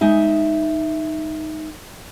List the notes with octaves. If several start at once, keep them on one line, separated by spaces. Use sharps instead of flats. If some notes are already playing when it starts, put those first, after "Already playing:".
G#3 D#4 E5